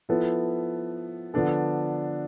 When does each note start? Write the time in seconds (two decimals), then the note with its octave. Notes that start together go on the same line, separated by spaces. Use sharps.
0.09 F3 B3 E4 A4
1.34 D3 F3 B3 D4 A4